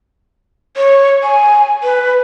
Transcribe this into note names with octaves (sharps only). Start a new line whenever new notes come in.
C#5
G#5
B4